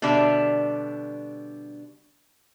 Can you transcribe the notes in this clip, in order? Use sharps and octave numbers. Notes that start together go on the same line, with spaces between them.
B2 D3 G3 D4 E5